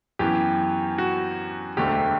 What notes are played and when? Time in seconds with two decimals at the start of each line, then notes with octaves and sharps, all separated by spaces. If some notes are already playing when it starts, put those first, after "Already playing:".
0.19 F#2 E3 B3 G4
0.98 F#4
1.77 E1 D2 D3 A3 G4